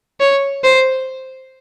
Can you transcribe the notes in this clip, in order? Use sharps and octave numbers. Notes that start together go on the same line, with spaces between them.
C#5
C5